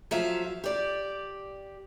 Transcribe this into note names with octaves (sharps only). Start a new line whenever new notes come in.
F3 F#3 E5 F5
G4 D5